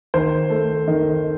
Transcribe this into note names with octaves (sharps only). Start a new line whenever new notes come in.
D#3 C5
A3
D#3